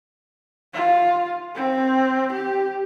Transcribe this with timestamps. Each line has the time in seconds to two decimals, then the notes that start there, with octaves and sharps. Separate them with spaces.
0.74 F4
1.55 C4
2.33 G4